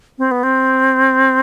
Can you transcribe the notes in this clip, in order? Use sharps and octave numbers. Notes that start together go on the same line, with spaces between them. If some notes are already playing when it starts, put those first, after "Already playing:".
C4
B3
C4